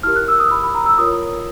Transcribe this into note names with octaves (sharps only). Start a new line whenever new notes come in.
E4 G4 A#4 F6
F#6
E6
D#6
B5
B5
A#5
E6
F4 A#4 C#5 D#6